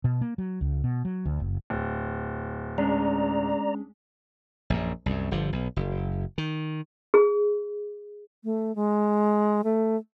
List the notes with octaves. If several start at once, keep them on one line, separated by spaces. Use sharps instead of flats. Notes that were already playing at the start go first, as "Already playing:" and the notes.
B2
A#3
F#3
C#2
B2
F#3
D2
F#1
D1
G#3 C#4 D4 D5 A#5
A#1 F#2
C2 F#2
G1 D3 F3
B1
F#1
D#3
G#4
A3
G#3
A3